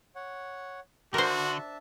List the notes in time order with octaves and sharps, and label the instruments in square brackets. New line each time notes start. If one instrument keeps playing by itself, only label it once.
[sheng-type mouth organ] C#5 F#5
[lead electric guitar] D3 [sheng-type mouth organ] D4 E5 A5 [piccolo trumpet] F#4 [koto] A#4 C5